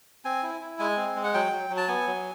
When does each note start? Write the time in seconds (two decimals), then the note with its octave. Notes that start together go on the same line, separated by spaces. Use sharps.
0.25 C4 G#5
0.43 E4
0.61 E4
0.79 G#3 G#5
0.97 C4
1.16 G#3
1.24 F#5
1.34 F#3 G5
1.52 F#3
1.70 F#3
1.77 A5
1.88 B3 G#5
2.07 F#3